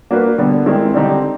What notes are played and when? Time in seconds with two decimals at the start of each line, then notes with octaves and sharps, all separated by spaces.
0.11 A#3 D4 F#4 B4
0.38 D3 G3 B3 D4
0.66 D#3 G#3 C4 E4
0.94 D3 G3 C4 D#4 G4